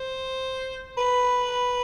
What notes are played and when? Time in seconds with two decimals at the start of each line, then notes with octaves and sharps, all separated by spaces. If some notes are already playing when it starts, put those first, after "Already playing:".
Already playing: C5
0.97 B4